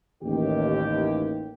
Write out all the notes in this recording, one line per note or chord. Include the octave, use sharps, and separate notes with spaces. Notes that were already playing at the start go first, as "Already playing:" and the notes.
A1 D#2 G4